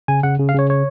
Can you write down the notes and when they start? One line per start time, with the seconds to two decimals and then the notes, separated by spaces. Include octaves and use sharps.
0.08 C#3 G#5
0.23 C#3 F#5
0.39 C#3
0.49 F5
0.55 C#3 C#5
0.70 C#5